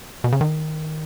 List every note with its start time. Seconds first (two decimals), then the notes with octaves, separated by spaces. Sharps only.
0.24 B2
0.32 C#3
0.41 D#3